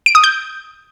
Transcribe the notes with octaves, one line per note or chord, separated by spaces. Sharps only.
D7
D#6
G6